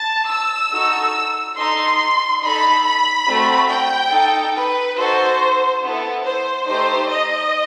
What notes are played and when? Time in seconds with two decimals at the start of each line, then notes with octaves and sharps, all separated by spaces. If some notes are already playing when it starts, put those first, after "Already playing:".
Already playing: A5
0.29 E6
0.71 D#4 F#4 A4
1.57 D#4 A4 C6
2.42 D#4 A4 B5
2.84 B5
3.27 A3 C4 F#4
3.69 G5
4.12 D#4 A4
4.55 B4
4.97 D#4 F#4 A4 C5
5.82 B3 E4 A4
6.24 C5
6.67 A3 D#4 G4 C5
7.09 D#5